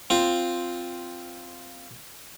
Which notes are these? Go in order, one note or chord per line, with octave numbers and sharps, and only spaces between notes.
C4 F4